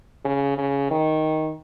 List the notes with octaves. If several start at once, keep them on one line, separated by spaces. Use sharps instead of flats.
C#3
C#3
D#3